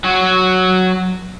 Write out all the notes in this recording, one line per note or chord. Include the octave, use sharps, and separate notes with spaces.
F#3 F#4